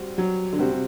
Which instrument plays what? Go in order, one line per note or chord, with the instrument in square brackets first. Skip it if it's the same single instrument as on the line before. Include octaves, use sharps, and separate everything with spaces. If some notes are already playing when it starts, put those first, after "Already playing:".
Already playing: [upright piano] G3 C4 F#4
[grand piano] F#3
D3
[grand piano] C3 [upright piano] G3 C4 F#4
[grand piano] C3